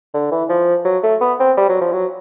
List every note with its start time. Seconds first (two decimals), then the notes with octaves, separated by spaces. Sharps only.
0.14 D3
0.31 E3
0.49 F3
0.85 F#3
1.03 A3
1.21 B3
1.39 C4
1.57 G3
1.69 F#3
1.81 F3
1.93 F#3